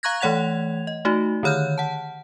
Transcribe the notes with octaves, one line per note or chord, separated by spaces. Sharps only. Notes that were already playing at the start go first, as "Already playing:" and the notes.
F5 A#5 C#6 F#6 G#6 A#6
E3 A3 C#5 F#5 G#6 F7
D#5
A3 D#4 F#4
D3 D#3 C#5 F6 G6
F#5 A5